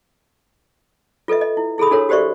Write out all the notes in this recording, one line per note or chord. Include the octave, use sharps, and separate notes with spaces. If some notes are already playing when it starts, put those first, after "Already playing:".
F4 A4 B4 D#5 E5
D#5
E4
E4 G#4 A4 B5 D#6
D4 F#4 A4 A#4 C#5
F#4 G4 C5 D5 E5 C#6